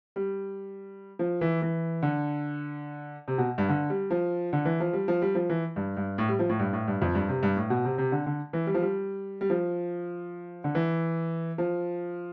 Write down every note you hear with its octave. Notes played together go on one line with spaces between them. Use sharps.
G3
F3
E3
E3
D3
C3
B2
G2
D3
G3
F3
D3
E3
F3
G3
F3
G3
F3
E3
G2
G2
A2
G3
F3
A2
G2
A2
G2
F2
G2
C3
G2
A2
B2
C3
C3
D3
D3
E3
G3
F3
G3
G3
F3
D3
E3
F3